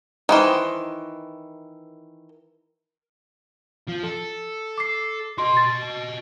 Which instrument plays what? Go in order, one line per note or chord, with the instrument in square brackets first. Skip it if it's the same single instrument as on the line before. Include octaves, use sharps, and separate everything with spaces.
[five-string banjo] D#3 E3 C5
[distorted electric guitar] F3
A4
[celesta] D6 C7
[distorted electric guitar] F#4 D#5 [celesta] C6
[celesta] A6